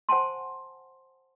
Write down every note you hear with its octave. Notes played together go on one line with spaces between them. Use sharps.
C5 F#5 G#5 A5 C6